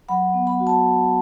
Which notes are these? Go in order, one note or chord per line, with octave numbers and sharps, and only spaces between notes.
F#3 F#5 B5
B3
F#5 B5
F#4
A5